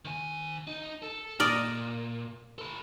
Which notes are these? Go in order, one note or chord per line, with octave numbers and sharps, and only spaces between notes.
D#3 G#5
D#4
A4
A#2 A#4 D5 D#5
A4 B4